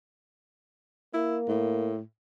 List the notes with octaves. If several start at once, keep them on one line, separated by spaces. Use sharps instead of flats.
A#3 E4
A2